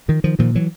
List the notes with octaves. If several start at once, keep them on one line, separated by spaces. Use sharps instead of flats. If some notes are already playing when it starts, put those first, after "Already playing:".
D#3 F3
D#3 F3
A#2 D#3 F3
E3 F#3